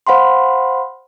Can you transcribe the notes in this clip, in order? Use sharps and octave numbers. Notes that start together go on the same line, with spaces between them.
C5 F5 F#5 B5 C6